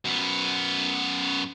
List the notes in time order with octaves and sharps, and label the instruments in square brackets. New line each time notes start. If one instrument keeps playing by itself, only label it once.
[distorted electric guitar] F#2 B3